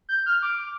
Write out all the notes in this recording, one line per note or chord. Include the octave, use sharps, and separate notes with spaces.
G6
F6
D6